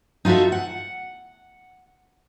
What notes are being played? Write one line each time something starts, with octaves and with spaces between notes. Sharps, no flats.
D#4 F4 F#4 A4 E5
F#5